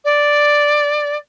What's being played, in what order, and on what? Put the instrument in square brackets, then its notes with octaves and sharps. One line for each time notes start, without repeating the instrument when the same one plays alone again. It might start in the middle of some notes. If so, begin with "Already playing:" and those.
[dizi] D5